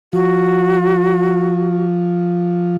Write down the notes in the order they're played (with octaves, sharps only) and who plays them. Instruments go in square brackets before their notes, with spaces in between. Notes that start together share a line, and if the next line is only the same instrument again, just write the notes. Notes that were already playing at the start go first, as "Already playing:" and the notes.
[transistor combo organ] F3 [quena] F#4